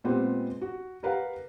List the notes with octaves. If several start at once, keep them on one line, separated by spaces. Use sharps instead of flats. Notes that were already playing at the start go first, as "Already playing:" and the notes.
A#2 G#3 B3 C4 G4
F#4
G4 A#4 B4 F5 F#5